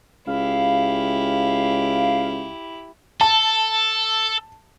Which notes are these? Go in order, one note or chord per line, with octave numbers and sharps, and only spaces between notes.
C#2 E4 G4 F5
A4 A5